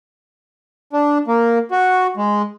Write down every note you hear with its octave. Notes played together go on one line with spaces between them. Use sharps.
D4
A#3
F#4
G#3